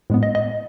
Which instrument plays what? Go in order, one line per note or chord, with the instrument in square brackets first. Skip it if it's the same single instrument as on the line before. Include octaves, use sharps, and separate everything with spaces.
[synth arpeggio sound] A2 G#3 B3
D#5
D#5